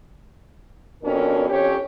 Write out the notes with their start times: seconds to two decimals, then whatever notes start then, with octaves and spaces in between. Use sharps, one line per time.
1.03 F2 B2 C#4 D4 A#4
1.50 F2 C#4 G4 C#5